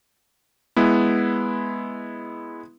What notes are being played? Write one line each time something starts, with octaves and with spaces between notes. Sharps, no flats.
G#3 B3 E4